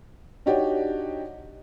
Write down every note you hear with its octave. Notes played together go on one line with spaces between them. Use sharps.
D4 D#4 F#4 G4 C#5 D5